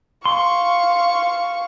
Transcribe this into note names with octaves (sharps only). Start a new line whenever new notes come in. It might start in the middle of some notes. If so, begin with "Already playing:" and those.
F5 C6 C#6